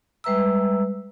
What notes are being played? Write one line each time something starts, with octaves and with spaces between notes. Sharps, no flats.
G3 G#3 B4 E5 A#5 E6